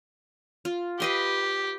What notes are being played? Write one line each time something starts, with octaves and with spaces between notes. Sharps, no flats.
F4
G4 B4 D#5 C6